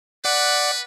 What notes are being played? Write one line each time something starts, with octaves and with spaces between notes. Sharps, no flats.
B4 D5 F#5